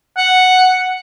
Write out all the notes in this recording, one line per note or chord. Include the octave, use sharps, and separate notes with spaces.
F#5